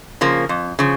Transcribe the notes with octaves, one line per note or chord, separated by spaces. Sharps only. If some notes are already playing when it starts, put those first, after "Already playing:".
C#3 F3 A#3
F2
C#3 F3